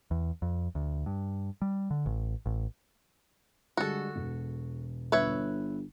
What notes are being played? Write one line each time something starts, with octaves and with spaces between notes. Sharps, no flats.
E2
F2
D2
G2
G3
D3
A1
A1
D3 G3 G#3 F#4 A4
E1
G1 B4 C#5 E5